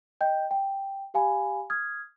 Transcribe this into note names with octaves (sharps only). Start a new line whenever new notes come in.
D#5 G5 G6
G5
G4 F5 G#5 B5
D#6 F6 G#6